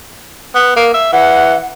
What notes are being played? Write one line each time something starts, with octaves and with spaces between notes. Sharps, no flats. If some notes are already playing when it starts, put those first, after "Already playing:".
B3
A#3
E5
E3 F#5